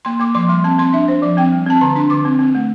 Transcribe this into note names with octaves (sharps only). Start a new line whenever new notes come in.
A#3 C6
A#3 D6
F3 C6
G3 C6
C4 A5
C4 C6
D4 E5
D4 C5
F3 D5
C4 G5
G3
C4 A5
D3 A#5
D4 C6
D3 D6
C4
C4
A3